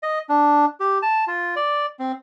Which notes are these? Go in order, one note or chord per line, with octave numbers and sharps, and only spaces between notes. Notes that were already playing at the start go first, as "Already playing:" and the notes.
D#5
D4
G4
A5
F4
D5
C4